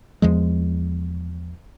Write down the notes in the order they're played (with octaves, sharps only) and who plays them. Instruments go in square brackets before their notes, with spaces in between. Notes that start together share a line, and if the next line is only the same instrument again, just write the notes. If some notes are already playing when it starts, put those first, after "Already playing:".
[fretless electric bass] E2 F3 G#3